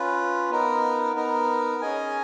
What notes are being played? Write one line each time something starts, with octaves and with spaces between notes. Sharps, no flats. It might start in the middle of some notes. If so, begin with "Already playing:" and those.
Already playing: C#4 F4 B4
B3 D#4 A#4
B3 D#4 A#4
C#4 G#4 D#5 G#5